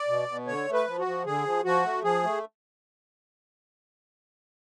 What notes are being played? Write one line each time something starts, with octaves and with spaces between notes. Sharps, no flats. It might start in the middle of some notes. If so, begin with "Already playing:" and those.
Already playing: D5
B2
B2
D3 C#5
A3
B4
F3
F#4
F3
D3 G#4
F3
F3 F#4
A3
F3 G#4
A3